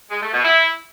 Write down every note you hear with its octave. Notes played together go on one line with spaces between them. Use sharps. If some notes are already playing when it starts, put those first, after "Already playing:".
G#3
A3
B2
E4